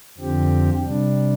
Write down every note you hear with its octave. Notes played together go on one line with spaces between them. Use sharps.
F2 D3 F3 C4 G4
C3 G3 D4